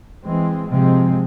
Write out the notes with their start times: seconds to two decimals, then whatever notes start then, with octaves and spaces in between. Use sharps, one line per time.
0.25 E3 G#3 C4
0.69 C3 F3 G#3 C4